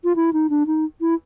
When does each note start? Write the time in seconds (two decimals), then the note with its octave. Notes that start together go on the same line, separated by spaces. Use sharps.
0.04 F4
0.16 E4
0.33 D#4
0.50 D4
0.66 D#4
1.01 E4